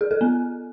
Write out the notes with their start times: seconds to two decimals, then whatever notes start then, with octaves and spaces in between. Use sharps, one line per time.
0.01 G#4
0.11 A4
0.21 B3